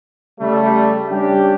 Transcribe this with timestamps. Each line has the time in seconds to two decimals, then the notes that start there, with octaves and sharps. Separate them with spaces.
0.40 C#3 G3 A3
1.11 G3 C#4 D4 G4